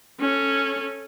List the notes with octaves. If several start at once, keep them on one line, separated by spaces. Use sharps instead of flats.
C#4 A4